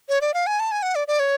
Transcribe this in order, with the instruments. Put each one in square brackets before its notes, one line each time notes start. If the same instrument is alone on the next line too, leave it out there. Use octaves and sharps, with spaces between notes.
[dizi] C#5
D5
F5
G#5
A5
G#5
F#5
D5
D5
C#5